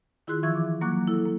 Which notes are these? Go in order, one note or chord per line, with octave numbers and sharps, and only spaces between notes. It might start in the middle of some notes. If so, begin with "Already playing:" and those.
D#3 E4 F4 G#4 C6 F#6
E3 F3 E5 C#6 E6 G#6
D6
E3 F#3 A#3 C#6 D6 F#6
E4 A4
A#3